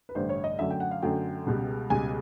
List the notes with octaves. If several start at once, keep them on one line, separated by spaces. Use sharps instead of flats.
B4
A1 G2 D3 C5
C#5
D#5
F#2 D3 F#3 A3 E5
G5
F#5
F5
F#2 D3 F#3 A3 G5
C#2 B2 G3
C#2 B2 G3 G#5